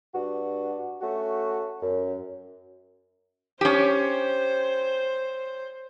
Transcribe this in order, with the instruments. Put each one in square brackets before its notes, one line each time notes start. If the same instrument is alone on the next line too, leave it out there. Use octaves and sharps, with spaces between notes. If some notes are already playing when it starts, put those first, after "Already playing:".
[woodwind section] G2 D4 F#4
A3 C#4 F#4
F#2
[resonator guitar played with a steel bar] C#4 G4 [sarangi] C5